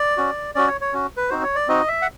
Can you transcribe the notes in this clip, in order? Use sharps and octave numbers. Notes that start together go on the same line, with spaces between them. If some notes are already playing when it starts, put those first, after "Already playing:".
Already playing: D5
C#4 F#4
C#4 F#4 D5
C#5
C#5
C#4 F#4
B4
C4 D#4 F#4 C5
C#5
D5
C4 D#4 F#4 D#5
E5
F#5